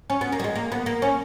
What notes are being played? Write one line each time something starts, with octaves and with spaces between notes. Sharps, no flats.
C#4
B3
A#3
G3
G#3
A#3
B3
A#3
C#4